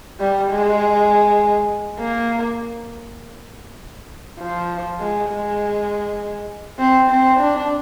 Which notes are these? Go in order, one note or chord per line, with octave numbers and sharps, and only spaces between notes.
G3
G#3
A#3
F3
G#3
G#3
C4
C4
D4